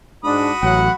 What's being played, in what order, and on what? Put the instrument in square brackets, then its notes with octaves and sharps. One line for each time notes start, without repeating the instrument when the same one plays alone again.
[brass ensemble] G#2 D4 [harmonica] F#4 B5 D#6
[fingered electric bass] A1 [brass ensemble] F#3 [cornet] F#5